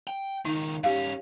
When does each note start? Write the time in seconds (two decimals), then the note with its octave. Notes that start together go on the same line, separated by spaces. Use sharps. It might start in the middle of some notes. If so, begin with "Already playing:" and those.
0.07 G5
0.45 C#2 D#3 D#4
0.84 G2 C#4 G4 F5